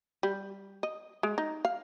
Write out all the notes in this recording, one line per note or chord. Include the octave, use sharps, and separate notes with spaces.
G3
D#5
G#3
D#4
F5